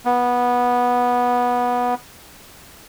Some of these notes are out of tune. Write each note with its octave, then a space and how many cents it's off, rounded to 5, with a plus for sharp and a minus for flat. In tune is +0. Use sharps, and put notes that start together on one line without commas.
B3 -15